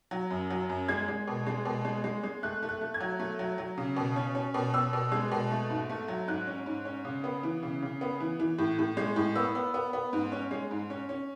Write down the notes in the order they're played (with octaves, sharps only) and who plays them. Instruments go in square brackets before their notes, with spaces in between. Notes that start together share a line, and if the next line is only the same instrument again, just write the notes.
[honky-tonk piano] F#3
F#2
F#3
F#2
G#3 G#6
G#3
B2
G#3
B2
G#3
G#3
G#3
A3 F#6
A3
F#6
A3
G#6
F#3
A3
F#3
F#3
C#3
B2
C#4
C#4
B2
B2 E6
B2
G#3
B2
A3
G#2
A3
F#3
G#2 F#6
C#4
G#2
C#4
C#3
B3
E3
C#3
C#3
B3
E3
E3
A2
A2
G#3
A2
B3 E6
B3
B3
B3
G#2
C#4
G#3
G#2
C#4
C#4